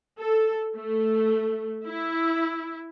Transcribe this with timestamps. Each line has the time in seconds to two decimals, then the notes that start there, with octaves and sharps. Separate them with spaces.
0.19 A4
0.77 A3
1.86 E4